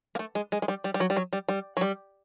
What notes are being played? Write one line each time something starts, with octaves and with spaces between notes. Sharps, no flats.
A#3
A3
G#3
G#3
G#3
G3
G3
G3
F#3
G3
F#3
G3
G3
F#3
G3